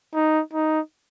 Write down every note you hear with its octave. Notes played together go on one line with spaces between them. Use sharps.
D#4
D#4